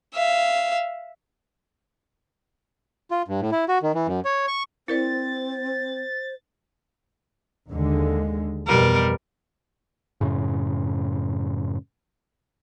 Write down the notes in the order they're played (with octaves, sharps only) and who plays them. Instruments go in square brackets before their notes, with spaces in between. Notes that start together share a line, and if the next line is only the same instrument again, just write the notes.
[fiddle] E5 F5
[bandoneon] F4
G2
A2
E4
F#4
D#3
E3
F#2
C#5
C#6
[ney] C4 [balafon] E4 A#4 D5 [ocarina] C5 [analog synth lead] A6
[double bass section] D#2 D3 G#3
[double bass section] F2 B2 E3 [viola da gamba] G3 A#4
[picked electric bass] F#2 A2 C#3